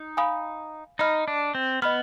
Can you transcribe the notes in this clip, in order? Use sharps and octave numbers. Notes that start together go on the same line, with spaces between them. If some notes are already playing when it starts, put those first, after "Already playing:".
Already playing: D#4
F5 G#5 B5 D#6
D#4 D#5 B5 F6
D4
C4
B3 D#5 B5 F6